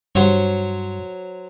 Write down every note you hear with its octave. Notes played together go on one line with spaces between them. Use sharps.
G2 F#3 C5 C#5